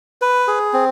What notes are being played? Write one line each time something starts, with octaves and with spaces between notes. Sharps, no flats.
B4
G#4
C4